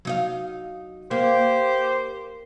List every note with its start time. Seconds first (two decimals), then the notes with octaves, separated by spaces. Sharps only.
0.05 F#3 D#4 F5
1.11 A#3 G4 C5